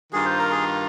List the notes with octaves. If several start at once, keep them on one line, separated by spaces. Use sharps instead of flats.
G2 D#3 A#3 F4 G#4
C5
A#4
G#4